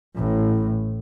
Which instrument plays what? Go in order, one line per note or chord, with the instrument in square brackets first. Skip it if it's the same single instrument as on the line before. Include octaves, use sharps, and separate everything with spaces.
[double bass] A1 A2